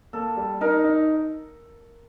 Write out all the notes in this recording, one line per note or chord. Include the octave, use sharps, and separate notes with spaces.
A#3 A4
G3
D#4 A#4
D#4